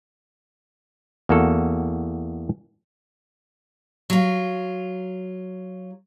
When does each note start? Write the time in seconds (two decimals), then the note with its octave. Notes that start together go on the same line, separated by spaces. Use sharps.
1.29 E2 A#3 F#4 A4
4.10 F#3 F4